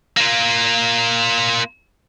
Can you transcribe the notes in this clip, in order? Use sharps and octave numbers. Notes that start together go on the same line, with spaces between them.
A#3 F4